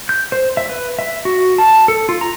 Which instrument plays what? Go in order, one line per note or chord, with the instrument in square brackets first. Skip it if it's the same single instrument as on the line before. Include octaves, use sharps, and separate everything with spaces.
[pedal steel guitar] G6
C5
E5
B4
E5
F#4
A5
A4
F4
A#5